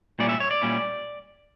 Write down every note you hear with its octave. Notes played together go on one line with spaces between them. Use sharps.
A#2 G3 C#4 E4 D5
E5
C#5
D5
A#2 G3 C#4 E4